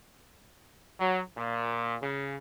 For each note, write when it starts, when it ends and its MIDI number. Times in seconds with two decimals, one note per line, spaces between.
0.99 1.21 54
1.36 1.96 46
2.02 2.35 49